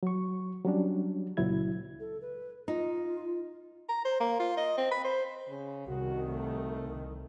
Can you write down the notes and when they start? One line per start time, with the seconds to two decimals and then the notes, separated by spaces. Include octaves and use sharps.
0.03 F#3 C#6
0.65 F#3 G3 C#4 D4
1.37 C#2 A#2 F#3 E4 G#6
2.00 A4
2.22 B4
2.68 D#4 F4
3.89 A#5
4.05 C5
4.20 A#3
4.39 F4
4.57 D#5
4.77 C4
4.91 B5
5.04 C5
5.49 C#3
5.87 C2 D#3 F#4
6.28 A3